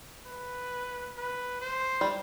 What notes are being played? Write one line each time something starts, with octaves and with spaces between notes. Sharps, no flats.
B4
B4
C5
G3